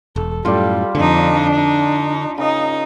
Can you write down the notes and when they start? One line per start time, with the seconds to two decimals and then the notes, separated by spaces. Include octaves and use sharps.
0.16 E1 A4
0.45 F#2 A2 G3 F4 A4 D5
0.95 F2 D3 D4 D#4
1.55 D#4
2.38 C#3 D#4 A#4 D#5